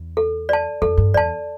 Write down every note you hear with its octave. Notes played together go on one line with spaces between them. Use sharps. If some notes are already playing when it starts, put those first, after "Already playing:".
Already playing: E2
A4
D5 A5
F2 A4
G2
E2 D5 A5